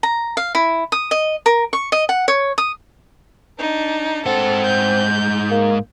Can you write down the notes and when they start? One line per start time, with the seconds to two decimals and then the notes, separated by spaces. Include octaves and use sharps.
0.03 A#5
0.37 F5
0.55 E4
0.92 D#6
1.11 D#5
1.46 A#4
1.73 C#6
1.92 D#5
2.09 F#5
2.28 C#5
2.58 D#6
3.59 D4 D#4
4.26 G#2 C4 A4 F#5
4.66 G6
5.50 A#3